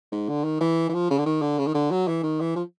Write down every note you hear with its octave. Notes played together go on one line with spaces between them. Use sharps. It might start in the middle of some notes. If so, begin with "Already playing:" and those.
G#2
D3
D#3
E3
E3
F3
C#3
D3
D#3
D3
C#3
D#3
D3
F#3
E3
D#3
E3
F3